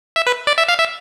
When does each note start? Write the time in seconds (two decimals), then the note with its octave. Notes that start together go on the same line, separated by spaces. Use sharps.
0.16 E5
0.27 B4
0.47 D5
0.58 E5
0.69 F5
0.79 E5